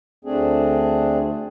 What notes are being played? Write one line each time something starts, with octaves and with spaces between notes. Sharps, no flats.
D2 A3 C4 D4 G#4